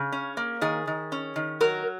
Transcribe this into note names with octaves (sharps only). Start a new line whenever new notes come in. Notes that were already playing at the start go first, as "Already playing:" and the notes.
Already playing: C#3 G#4
C#4
A#3
D#3 G#4
D#3
C#4
D#3
F#3 A#4